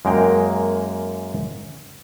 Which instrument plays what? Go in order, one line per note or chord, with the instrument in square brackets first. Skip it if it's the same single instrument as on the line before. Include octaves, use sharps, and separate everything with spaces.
[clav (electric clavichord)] F#2 G#3 A#3 A#4 G5